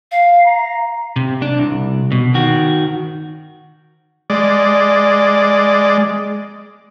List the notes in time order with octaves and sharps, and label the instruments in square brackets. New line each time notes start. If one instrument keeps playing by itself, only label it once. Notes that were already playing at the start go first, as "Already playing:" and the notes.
[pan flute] F5
[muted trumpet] A#5
[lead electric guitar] C3
D4
C2
B2
D#3 F#4
[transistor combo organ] G#3 D5